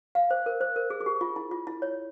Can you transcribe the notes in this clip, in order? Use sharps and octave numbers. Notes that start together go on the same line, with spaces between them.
F5
C5
A#4
C5
A#4
G#4
G#4
G4
F4
E4
F4
E4
C#5